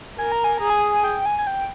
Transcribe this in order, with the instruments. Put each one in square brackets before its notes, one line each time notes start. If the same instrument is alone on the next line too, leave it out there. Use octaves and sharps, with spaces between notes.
[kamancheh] A#4 [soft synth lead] G#5
[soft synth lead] A#5
G#5
[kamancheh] G#4 [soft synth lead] A#5
[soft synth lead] G#5
G5
G#5
G#5
G5